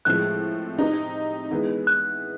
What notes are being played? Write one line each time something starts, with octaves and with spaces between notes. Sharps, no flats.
A2 F3 G#3 C4 F#6
C4 D#4 G4
E3 G#3 B3
F#6